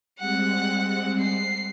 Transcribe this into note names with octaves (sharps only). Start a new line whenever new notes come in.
G3 G#3 C4 F#5
C7